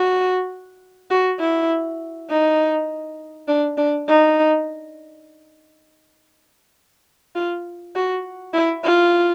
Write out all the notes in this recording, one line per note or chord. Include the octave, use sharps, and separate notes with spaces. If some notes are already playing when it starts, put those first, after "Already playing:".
Already playing: F#4
F#4
E4
D#4
D4
D4
D#4
F4
F#4
E4
F4